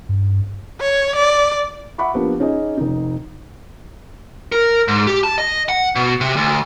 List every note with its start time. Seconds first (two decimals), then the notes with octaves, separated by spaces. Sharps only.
0.09 G2
0.81 C#5
1.16 D5
1.98 E5 F#5 B5 C#6 D6
2.14 F3 A#3 B3 D4 G4
2.40 C#4 D#4 G#4 D#5
2.77 F1 D#4
4.52 A#4
4.88 G#2
5.07 G4
5.24 A5
5.38 D#5
5.69 F#5
5.96 B2
6.21 C3
6.36 D2